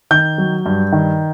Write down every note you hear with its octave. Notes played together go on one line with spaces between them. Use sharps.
D#3 G6
F#3
G2
D#3